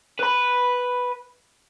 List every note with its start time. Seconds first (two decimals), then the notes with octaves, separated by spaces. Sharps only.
0.20 B4 B5